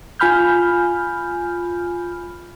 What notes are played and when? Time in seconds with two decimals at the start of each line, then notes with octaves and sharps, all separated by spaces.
0.20 F4 G#5 B5 F6 G6